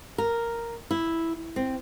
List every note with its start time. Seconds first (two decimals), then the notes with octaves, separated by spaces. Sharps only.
0.18 A#4
0.91 E4
1.56 C4